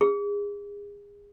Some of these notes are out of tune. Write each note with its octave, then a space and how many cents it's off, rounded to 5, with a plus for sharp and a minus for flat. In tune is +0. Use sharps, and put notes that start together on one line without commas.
G#4 -30